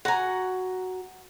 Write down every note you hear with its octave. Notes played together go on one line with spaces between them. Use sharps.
F#4 F#5 G#5 A#5